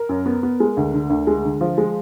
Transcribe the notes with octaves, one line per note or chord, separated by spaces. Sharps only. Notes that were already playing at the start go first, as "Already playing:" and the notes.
Already playing: A#4
F#2
B3
B3
G#3
D2
D3
D2
G#3
D3
F3
G#3